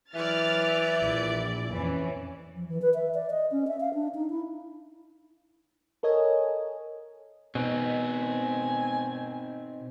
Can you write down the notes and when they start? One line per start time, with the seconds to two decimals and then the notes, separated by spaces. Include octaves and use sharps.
0.15 E3 F#3 E4 D5 F6 A6
1.01 A#1
1.72 F2 E3 C#4
2.55 F3
2.68 E3
2.82 B4
2.94 E5
3.15 D5
3.30 D#5
3.51 C#4
3.68 E5
3.80 F5
3.94 D4
4.15 D#4
4.30 E4
6.03 A4 A#4 C#5 D#5 G#5
7.55 B2 C4 D#4 G#5